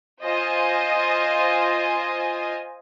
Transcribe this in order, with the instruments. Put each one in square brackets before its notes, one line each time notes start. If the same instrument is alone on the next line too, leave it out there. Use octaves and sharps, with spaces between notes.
[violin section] F4 C5 D#5 G#5